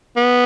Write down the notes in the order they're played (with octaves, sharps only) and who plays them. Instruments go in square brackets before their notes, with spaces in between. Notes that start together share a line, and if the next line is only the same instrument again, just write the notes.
[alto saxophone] B3